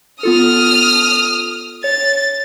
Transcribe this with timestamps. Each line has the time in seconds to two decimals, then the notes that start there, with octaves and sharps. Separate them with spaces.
0.23 B3 F4 A4 D#6 F6
1.84 C#5 A6